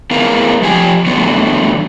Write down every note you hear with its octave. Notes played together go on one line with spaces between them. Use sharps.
B3 E4 G#4 A#4 B4 F5
F3 G4 G#5
D3 E3 F#3 G3 A3 B3